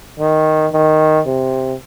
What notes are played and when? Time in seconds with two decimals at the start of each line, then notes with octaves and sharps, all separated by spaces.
0.19 D#3
0.73 D#3
1.26 C3